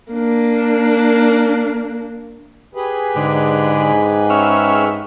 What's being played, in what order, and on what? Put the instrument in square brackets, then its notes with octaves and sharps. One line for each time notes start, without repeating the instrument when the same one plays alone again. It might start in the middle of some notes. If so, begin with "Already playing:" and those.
[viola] A#3 D4
[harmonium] G4 G#4 B4
[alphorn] G#2 [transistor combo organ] D3
[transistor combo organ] C#4 E5 F6